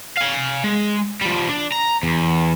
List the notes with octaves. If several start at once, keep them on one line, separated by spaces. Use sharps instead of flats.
F5 G#5
G#3
F3 G3
D4
A#5
E2